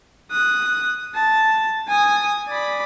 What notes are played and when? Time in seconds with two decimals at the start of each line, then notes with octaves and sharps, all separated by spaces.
0.31 D#6 F#6
1.15 A5
1.88 G#5 D#6
2.48 D5 B5